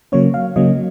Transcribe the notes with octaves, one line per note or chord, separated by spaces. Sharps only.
C#3 F#3 A#3 C#4 C#5
F5
C#3 F#3 A#3 C#4 D#5